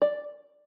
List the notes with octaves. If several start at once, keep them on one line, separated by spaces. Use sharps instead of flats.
D5